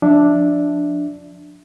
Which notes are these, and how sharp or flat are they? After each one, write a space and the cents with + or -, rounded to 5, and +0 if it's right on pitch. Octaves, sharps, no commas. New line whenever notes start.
F3 +25 D4 +0 E5 +0